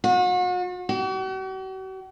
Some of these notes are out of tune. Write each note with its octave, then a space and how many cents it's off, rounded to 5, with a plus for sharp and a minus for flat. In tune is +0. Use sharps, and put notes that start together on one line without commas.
F#4 -40
F#4 +45